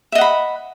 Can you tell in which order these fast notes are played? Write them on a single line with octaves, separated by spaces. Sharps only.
E5 D#5 F#5 B5